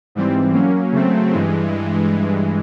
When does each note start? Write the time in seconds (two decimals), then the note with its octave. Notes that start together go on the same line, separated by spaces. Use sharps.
0.15 G#2 E3 G3 C4
0.53 F#3 A#3 C#4
0.92 C#3 F#3 A3 C4
1.32 G2 E3 G#3